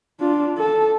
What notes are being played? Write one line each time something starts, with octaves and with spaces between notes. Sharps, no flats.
D4 F4
A4